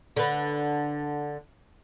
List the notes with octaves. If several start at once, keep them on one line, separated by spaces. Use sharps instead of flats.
D3 B4